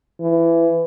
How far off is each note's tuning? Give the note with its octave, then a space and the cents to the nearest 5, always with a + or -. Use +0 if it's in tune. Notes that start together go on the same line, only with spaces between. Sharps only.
E3 +20